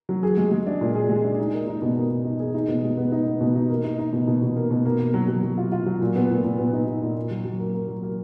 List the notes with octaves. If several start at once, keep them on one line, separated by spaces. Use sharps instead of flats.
F#3
G#4
G#3
G#3
D4
A#2
G#4
G#3
D4
D#4
A#3
D#4
B2
A#3
A#3
D#4
G#4
D#4
B2
G#3
B3
D#4
B3
B2
D#4
A#3
D#4
D#4
B2
B2
B2
A#3
B2
A#3
A#3
F#3
F#3
F#3
F4
F4
F#3
A#2
B3
A#2
A#2
B3
D#4
D#4
A#2
A#3
F#3
F#3
A#3
A#3
F#3
A#3